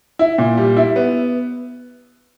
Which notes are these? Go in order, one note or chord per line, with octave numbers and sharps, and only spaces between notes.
E4
A#2
G3
E4
B3